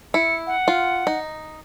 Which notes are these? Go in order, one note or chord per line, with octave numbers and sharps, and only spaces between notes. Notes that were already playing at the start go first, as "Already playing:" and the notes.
E4 C#7
F#5
F4
D#4